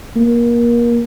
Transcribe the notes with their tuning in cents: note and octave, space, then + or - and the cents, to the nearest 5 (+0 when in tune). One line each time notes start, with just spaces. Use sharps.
A#3 +25